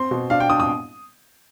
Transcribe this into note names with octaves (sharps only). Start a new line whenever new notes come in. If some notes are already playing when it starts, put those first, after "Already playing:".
Already playing: C4 C6
B2
D4 F5
G5
D4 D#6
D#6